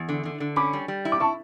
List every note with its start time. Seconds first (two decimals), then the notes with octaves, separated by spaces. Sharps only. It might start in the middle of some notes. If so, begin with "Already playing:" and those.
Already playing: E2
0.09 D3
0.25 D3
0.40 D3
0.56 C#4 B5 D6
0.73 G3
0.88 G3
1.05 E4
1.12 D6
1.20 E4 A5 C#6